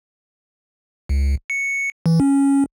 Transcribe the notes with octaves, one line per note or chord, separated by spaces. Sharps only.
C#2
C#7
E3
C#4